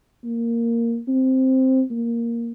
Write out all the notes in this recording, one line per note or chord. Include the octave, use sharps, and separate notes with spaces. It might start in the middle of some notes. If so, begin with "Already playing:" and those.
A#3
C4
A#3